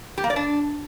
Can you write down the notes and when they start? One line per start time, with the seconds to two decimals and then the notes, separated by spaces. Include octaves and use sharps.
0.18 G4
0.24 A#3
0.30 D5
0.36 D4